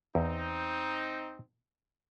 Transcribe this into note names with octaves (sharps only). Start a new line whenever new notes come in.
E2 C4 D#4